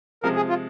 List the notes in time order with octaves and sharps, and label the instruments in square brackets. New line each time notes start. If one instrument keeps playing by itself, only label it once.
[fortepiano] C3 F3 G#3 [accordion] A#4
[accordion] G#4
F4